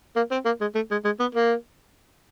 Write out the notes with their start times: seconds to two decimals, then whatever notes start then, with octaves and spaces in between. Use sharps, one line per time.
0.16 A#3
0.31 C4
0.45 A#3
0.61 G#3
0.75 A3
0.91 G#3
1.05 G#3
1.20 B3
1.35 A#3